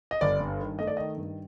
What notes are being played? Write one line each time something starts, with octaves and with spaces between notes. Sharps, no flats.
D#5
G1 D5
G2
D#3
A3 D#5
D5
D#3 D#5
G2